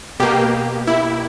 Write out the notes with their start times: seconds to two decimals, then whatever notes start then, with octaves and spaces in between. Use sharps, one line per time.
0.20 B2 A#3 G4
0.87 E4